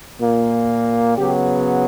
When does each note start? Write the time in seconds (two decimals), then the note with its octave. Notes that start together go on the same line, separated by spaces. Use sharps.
0.20 A#2 A#3
1.17 C#3 F#3 B3 G4